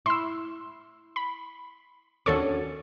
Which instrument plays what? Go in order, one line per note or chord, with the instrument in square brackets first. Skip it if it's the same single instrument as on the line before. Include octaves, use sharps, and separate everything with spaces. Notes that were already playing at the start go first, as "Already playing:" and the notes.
[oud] E4 [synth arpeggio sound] C6 E6
[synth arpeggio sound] B5
[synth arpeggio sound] D#2 A4 C#6 [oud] C#4 D4 F#4